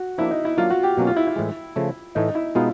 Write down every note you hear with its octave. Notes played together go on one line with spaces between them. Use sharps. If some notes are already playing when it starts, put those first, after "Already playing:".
Already playing: F#4
F3 A#3 D4 E4
D#4
E4
F#3 A#3 D4 F4
F#4
G4
B2 F#3 A#3 C#4
F4
E4
E4
A2 E3 G#3
C#3 F3 A3
A2 E3 A3 D#4
E4
B2 G#3 B3 D#4 F4